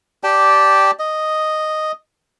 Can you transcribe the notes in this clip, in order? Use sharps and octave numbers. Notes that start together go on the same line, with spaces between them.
G4 D5 G5 A5
D#5